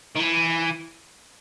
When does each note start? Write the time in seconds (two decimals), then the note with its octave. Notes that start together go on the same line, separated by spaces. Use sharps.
0.15 D#3
0.19 E3